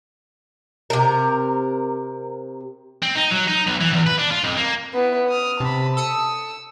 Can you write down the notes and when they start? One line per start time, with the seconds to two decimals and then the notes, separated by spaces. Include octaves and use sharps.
0.90 C3 A#4
3.02 C4
3.15 D#4
3.31 F#3
3.48 D#4
3.67 B1
3.81 E3
3.93 E2
4.07 B4
4.19 D4
4.32 F4
4.44 F2
4.57 A#3
4.94 B3 E4
5.28 D#6 F6
5.60 C3 A5 B5
5.97 A4 D#6 E6 C#7